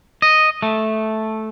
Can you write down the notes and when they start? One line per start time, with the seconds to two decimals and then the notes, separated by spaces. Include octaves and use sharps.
0.22 D#5
0.62 A3